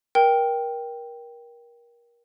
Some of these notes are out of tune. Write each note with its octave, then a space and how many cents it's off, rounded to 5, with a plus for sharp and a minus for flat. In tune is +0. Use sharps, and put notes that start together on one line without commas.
A#4 +25 G5 +0